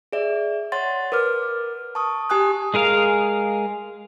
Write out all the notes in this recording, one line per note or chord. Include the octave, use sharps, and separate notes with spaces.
G#4 D5 E5
C#5 F#5 C6 A6
A#4 B4 D6 F6
A5 C#6 D#6
G4 G#5 D#6 F#6
G#3 G#4 A#4 F5